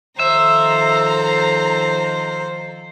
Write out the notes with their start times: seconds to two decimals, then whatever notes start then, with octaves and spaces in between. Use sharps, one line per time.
0.19 D#3 F3 A4 C5 E5 A#5